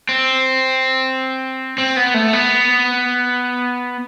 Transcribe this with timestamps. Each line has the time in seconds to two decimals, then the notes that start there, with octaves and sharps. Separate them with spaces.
0.09 C4
1.78 C4
1.97 B3
2.14 A3
2.33 B3